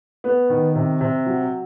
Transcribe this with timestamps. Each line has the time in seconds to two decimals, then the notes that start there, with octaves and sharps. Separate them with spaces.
0.24 B3
0.50 D#3
0.75 C3
1.01 C3
1.26 F#3